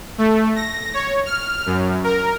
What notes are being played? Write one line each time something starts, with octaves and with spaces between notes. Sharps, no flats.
A3
A#6
C#5
F6
F#2
A#4